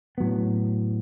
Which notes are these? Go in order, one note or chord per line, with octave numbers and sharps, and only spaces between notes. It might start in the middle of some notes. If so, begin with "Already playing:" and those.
A2 F#3 B3